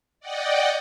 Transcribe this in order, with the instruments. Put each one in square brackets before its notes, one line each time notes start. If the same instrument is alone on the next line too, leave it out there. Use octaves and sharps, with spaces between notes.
[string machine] D5 D#5 F#5 G5